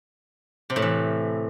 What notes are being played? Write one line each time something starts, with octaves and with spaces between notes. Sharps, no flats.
C3
A2
E3